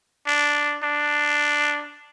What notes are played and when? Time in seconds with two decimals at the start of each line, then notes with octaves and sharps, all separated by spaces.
0.27 D4
0.83 D4